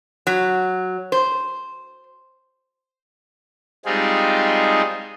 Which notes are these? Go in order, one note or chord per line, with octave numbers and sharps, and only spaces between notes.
F#3
C5
G3 G#3 C4 D#4 F4 G#4